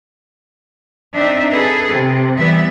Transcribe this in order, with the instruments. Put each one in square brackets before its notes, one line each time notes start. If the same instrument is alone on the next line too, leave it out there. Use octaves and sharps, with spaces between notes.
[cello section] C4 D4 D#4 E5
G#4 A4 B4
C3
E3 G3 B3 E5